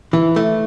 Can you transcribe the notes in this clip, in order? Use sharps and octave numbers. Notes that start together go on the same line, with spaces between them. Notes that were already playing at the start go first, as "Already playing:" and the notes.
E3
A3